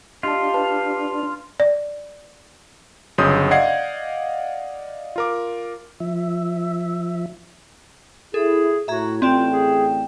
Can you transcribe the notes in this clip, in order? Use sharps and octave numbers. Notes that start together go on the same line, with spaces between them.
D4 F4 G4 D#5 A5
B4 A5
D5
G1 C#3 F#3 C6 D#6 G6
D5 D#5 F5 F#5 G#6 C7
F4 A#4 D6
F3 E5
E4 G#4 A4
A2 F#4 E5 A#5 G#6
A1 A3 C4 F4 D5 G5 E7
G#4